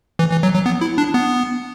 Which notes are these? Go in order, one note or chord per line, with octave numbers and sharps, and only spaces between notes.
E3
E3
F#3
F#3
B3
E4
D4
B3